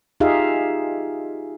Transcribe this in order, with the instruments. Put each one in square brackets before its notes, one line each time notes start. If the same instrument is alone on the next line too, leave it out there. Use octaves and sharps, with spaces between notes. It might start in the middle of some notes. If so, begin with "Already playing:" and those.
[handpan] D#4 F4 G4 G#4 E5 F5